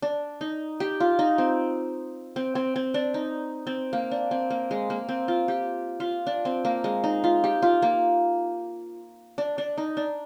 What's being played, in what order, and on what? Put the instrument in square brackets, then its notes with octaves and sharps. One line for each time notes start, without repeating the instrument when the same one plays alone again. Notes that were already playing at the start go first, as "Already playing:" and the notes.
[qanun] D4
D#4
G4
F4
D#4
C4
C4
C4
C4
D4
D#4
C4
A#3
D4
C4
A#3
G#3
A#3
C4
F4
G4
F4
D4
C4
A#3
G#3
D#4
F4
G4
F4
A#3
D4
D4
D#4
D4